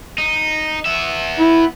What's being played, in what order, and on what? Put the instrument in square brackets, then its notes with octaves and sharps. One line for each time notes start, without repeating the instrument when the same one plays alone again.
[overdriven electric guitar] D#4
B3 E5
[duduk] E4